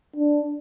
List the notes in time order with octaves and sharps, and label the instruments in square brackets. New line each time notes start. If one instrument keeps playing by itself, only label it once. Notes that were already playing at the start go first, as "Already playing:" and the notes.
[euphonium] D4